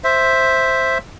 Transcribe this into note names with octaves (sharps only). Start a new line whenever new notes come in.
C5 E5